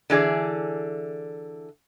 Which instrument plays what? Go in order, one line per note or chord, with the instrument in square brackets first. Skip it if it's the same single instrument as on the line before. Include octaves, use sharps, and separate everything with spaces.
[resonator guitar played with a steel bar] D3 E3 G#4 D5